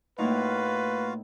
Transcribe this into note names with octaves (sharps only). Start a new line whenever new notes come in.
A2 A#3 D#4 F4 F#4 B4 F5